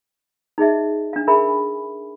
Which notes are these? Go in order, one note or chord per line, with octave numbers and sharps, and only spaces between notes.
D#4 G#4 D#5 E5
D4 F5
G#4 A#4 E5 G#5 B5